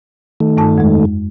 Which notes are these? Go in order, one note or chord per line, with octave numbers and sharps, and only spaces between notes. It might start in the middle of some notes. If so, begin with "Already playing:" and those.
D#3 A3
G2 D#4 A5
F2 G#3